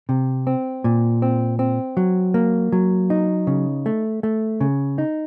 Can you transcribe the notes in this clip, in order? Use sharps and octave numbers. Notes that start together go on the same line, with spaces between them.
C3
C4
A#2
C4
C4
F#3
A#3
F#3
D#4
C#3
A3
A3
C#3
D#4